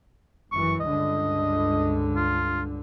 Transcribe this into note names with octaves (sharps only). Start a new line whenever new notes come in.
G1 F#2 E3 C#6
C#2 G2 D3 D#5
F4